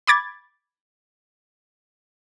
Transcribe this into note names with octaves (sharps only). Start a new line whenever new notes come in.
B5 D6 G#6 A6